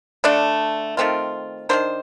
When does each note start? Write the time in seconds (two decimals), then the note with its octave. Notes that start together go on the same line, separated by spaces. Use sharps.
0.24 D3 A3 D4 D5
0.97 D#3 A3 C4 F4
1.69 D#3 A#3 D4 C5